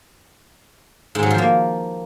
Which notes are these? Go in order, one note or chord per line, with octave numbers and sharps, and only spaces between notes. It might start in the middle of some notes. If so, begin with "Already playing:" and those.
G#2
F#3
F3
A#3